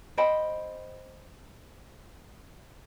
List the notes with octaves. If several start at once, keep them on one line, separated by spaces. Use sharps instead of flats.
C5 D#5 G5 B5